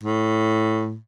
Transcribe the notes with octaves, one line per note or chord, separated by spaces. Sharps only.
A2